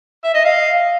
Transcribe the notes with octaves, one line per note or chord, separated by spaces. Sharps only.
E5
D#5
F5